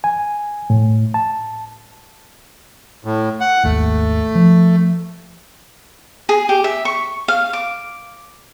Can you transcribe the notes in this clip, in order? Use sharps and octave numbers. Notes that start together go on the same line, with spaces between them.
G#5
A2
A5
A2
F#5
G#1 D#2 A3
F3
G#4
G4
E5
C#6
F5
D6